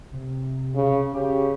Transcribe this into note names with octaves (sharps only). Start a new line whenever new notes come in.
C3
C#3
C#3 G4